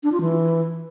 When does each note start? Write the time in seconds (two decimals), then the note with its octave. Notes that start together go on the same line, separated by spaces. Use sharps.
0.03 D4
0.12 F4
0.21 E3